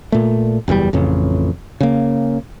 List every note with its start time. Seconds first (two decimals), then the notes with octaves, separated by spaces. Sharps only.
0.12 A#2 A3
0.68 F#1 E2 B2 G3
0.93 A1 F2 C#3
1.81 C#3 A#3